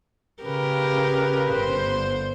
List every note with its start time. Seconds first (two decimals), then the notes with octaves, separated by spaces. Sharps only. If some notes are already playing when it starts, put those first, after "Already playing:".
0.43 C#3 G4 A#4 B4
1.53 G1 C5